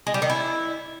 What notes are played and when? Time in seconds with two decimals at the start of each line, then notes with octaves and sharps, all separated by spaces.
0.07 G#3
0.14 G3
0.22 D#3
0.30 E4